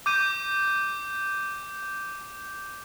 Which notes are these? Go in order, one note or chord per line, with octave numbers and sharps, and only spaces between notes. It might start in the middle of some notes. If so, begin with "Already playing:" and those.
D6 G6 D#7